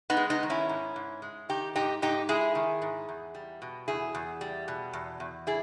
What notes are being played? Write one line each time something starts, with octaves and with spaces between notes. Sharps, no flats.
B3 D#4
G#3
B3 D#4
D#3
C#4 E4
G#2
G#2
G#3
D#3 D#4 G4
G#2 D#4 G4
G#2 D#4 G4
G#3 E4 G#4
D#3
G#2
E2
G3
B2
E2 E4 G#4
E2
G3
B2
E2
E2
G3 E4 G#4